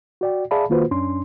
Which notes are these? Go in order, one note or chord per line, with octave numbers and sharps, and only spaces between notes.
F#4 D5 G5
G#4 D5 E5 F5 A5 B5
D#3 A#3 F4 F#4 B4 C5
F#2 C#4 D4 C6